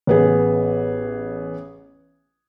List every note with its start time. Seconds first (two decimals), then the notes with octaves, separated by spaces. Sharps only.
0.07 A1 B3 G#4